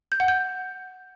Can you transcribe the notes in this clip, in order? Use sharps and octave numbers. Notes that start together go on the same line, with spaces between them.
G6
F#5
G6